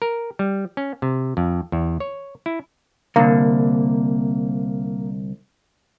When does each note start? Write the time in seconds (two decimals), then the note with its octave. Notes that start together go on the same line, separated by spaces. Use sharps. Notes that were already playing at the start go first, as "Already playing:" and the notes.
0.02 A#4
0.39 G3
0.77 C#4
1.02 C3
1.37 F2
1.72 E2
2.00 C#5
2.46 E4
3.16 C2 D3 A#3